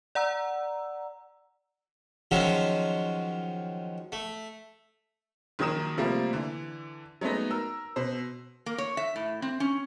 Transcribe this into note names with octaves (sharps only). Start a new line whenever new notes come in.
D5 F#5 A#5 E6
D#3 F3 F#3 G#3 C#4 E5
A3
A#1 D#3 F#3 A#4 D#6 E7
C3 F3 G3 A3 A#3
D3 E3
F#3 G#3 A3 B3 D#4
A#4 E6
B2 C5
A#3
C#5
E5
A2
C4
C#4